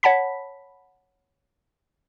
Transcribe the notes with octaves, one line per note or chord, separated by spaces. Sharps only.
C#5 F#5 A5 B5 B6